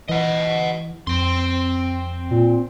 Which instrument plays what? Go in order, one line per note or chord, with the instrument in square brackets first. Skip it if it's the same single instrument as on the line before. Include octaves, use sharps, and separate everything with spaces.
[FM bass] E3 [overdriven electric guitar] D#5 F#5
[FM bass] F2 [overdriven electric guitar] C4 C6
[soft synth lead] A#2